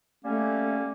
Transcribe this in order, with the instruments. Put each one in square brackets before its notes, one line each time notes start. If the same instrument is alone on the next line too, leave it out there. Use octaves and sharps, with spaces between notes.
[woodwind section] G3 A#3 C#4 [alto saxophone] A3